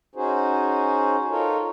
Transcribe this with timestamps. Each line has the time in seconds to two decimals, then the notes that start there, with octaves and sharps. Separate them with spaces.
0.15 C#4 D#4 F#4 G#4 C5
1.29 D#4 F4 A4 A#4 C#5